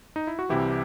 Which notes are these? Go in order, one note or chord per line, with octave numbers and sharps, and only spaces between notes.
D#4
E4
F#4
C2 C3 E3 E4 G4